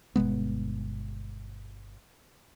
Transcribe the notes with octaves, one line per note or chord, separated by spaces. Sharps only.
G1 B2 G#3 B3